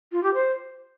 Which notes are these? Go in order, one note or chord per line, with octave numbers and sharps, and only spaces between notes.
F4
G4
C5